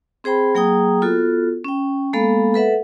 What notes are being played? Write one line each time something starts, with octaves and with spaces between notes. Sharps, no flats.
C4 G#4 C5 G5 B5
F#3 A#3 G#4 G5 A#5 D#6
B3 F4 F#4 A4
C#4 G5
G#3 A#3 B3 A4 F5 B5
A4 B4 E5 F#5